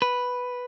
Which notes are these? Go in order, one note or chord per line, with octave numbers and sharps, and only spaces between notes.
B4